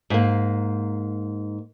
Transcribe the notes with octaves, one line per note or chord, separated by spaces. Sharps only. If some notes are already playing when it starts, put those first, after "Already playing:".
G#2 A#3